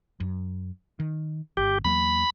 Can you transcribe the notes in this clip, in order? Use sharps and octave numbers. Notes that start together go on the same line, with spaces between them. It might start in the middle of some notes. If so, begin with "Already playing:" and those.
F#2
D#3
G1 G4
E2 F#3 A#3 B5